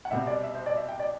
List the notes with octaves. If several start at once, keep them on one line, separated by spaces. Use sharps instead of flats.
F#5
C2 B2 G3 C4 E5
D5
E5
C5
D5
E5
G5
D5